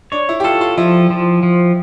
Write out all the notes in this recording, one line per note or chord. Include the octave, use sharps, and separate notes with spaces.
D4 C#5
E4
G4
F4 A4
F4
F3 E4
F3
F3